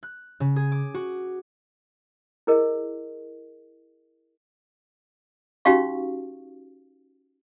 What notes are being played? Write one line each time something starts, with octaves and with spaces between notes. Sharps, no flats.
F#6
C#3
G#4
D6
F#4
E4 G#4 A#4 D#5
C#4 D#4 F#4 G4 F5 C#6